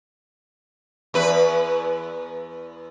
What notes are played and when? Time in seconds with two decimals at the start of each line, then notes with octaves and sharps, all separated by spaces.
1.14 E2 B4